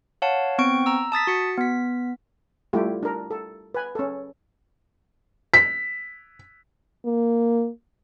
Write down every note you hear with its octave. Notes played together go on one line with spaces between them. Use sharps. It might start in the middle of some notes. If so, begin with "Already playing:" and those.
C#5 F5 F#5 A5
B3 C4 G5 C#6 D7
A#5 E6
A5 D#6 A6 B6
F#4 C#7
B3 B6
G3 A3 E4 F4 G4
D4 A#4
A4
B4 G#5
C#4 A4
B6
A#3